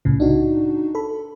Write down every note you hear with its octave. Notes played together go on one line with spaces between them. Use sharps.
C2 A2 C#3
D4 D#4 F#4
A4 B5